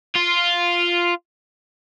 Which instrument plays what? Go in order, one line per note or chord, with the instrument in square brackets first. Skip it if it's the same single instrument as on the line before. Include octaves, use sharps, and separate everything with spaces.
[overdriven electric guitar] F4